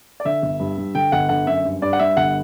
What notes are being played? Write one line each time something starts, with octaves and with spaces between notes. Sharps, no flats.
D5
D3 E5
G1
G2
G2
D3 G5
G1 F#5
D3 F#5
F#2 E5
G2
G2 D5
F#5
G2 E5
G1 F#5